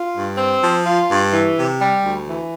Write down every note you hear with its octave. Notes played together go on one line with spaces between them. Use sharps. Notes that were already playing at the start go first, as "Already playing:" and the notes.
Already playing: F4
G2
C4
F3
F4
G2
E3
C3
G3
D2
E3